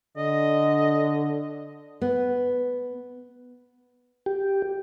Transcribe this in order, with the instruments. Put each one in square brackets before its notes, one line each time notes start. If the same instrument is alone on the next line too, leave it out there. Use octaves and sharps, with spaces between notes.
[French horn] D3 [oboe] D#5
[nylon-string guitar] B3
[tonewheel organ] G4